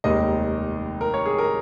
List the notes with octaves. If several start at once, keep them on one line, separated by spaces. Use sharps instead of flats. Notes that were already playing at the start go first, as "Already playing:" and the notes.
F1 D#2 D#3 G#3 D#5
A#4
C#5
G#4
A#4